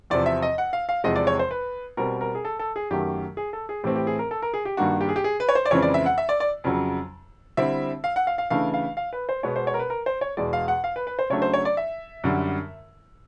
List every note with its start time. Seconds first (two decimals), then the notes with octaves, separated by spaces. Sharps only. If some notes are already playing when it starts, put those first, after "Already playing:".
0.10 E2 C3 F3 D5
0.26 E5
0.42 D#5
0.58 F#5
0.73 F5
0.89 F5
1.04 E2 C3 F3 G#3 D#5
1.16 D5
1.27 C#5
1.39 C5
1.51 B4
1.97 B2 G3 C4 A#4
2.21 A#4
2.35 G#4
2.45 A4
2.59 A4
2.76 G#4
2.91 F#2 D#3 F#3 A3 G4
3.37 G#4
3.53 A4
3.69 G#4
3.84 A2 E3 A3 C4 G4
3.96 G4
4.07 G#4
4.19 A#4
4.31 A4
4.42 A#4
4.54 G#4
4.65 G4
4.77 G2 D#3 G3 A#3 D4 F#4
5.01 G4
5.09 G#4
5.16 G4
5.24 G#4
5.40 B4
5.49 C#5
5.55 C5
5.66 D5
5.71 F2 C#3 E3 G#3 C4 C#5
5.82 D5
5.94 E5
6.06 F#5
6.18 E5
6.29 D5
6.40 D5
6.64 F2 C#3 F#3
7.57 D3 G3 C4 E4 E5
8.04 F5
8.16 F#5
8.27 F5
8.38 F5
8.50 C#3 E3 A3 D4 F5
8.74 F5
8.97 F5
9.13 B4
9.29 C5
9.43 B2 G#3 B3 C#5
9.56 C5
9.67 C#5
9.74 A#4
9.79 B4
9.90 A#4
10.06 C5
10.21 C#5
10.37 E2 B2 G#3 D5
10.53 F5
10.68 F#5
10.84 F5
10.96 B4
11.07 B4
11.19 C5
11.30 C#3 F#3 A3 D4 C#5
11.42 C5
11.54 C#5
11.65 D5
11.77 E5
12.24 F#2 D3 G3